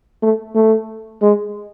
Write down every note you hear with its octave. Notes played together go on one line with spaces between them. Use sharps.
A3
A3
G#3